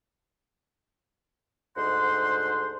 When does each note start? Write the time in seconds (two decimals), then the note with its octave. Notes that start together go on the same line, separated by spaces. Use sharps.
1.76 D2 G#2 C5 F#5 C6